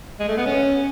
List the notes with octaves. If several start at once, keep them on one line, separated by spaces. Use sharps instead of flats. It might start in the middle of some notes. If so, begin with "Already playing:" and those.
G#3
A3
B3
C#4